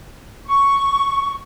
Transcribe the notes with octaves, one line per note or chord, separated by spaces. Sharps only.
C#6